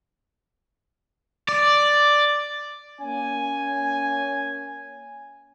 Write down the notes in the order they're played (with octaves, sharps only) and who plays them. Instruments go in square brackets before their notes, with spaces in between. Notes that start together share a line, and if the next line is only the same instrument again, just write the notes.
[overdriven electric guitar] D5
[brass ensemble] A#3 C#4 G#5